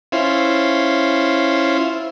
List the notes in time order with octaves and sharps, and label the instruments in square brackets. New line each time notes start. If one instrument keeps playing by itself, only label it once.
[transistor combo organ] C#4 E4 F4 C5